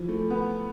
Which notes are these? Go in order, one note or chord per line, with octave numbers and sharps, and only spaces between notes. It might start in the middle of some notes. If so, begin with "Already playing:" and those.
Already playing: E3 F3
A3
B3